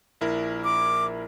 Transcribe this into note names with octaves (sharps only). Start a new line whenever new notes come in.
A#1 E4 A#4
D6